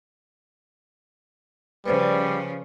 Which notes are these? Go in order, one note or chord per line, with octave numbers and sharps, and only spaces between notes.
C#3 F3 G3 B4 C5 D5